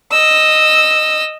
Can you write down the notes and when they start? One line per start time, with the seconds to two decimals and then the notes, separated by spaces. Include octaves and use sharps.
0.11 D#5 E6